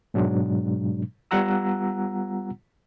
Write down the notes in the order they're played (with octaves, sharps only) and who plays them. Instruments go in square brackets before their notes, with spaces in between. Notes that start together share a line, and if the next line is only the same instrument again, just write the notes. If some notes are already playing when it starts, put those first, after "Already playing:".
[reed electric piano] G#2 B2 F#3 G#3 D4
G3 B3 F4 F#5 A#5 E6